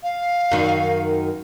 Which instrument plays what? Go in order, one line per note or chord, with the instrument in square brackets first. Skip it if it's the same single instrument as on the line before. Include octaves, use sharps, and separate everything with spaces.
[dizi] F5
[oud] F#2 D#3